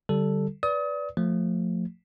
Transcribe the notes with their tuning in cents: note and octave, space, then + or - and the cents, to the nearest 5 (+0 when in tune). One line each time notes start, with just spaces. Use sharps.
D3 +0 G3 -15 A4 +0
B4 +0 D5 -15 D#6 +35
F3 +20 A3 +25